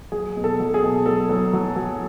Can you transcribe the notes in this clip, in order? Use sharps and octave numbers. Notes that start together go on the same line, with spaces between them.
F#3 G#4
B2
A4
F#3
G#4
B2
F#3 A4
F#3
F#3
F#3